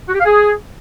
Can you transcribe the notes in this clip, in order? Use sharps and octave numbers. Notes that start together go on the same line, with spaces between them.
F#4
G4
F5
G#4